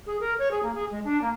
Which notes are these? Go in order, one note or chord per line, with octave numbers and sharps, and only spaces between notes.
G#4
A#4
C#5
G#4
A#3
G#4
G#3
D4
A#3